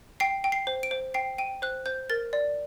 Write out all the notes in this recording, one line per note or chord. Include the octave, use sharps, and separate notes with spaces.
G5 C7
G5
C7
C5
D7
C5
G5 C7
G5 D#7
C5 F#6
C5 G6
A#4 A6
D5